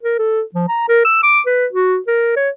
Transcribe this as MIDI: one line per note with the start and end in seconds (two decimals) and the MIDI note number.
0.03 0.17 70
0.19 0.42 69
0.55 0.65 53
0.68 0.85 82
0.88 1.02 70
1.05 1.21 88
1.23 1.40 86
1.46 1.66 71
1.73 1.98 66
2.07 2.36 70
2.36 2.50 73